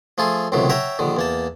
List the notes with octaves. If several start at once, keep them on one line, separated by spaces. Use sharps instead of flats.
F3 A3 F4 G#4
C#2 A2 C3 D#3 F#3
C#5 E5 F#5 G5 A#5
A#1 D3 D#3
E2 A#3 A5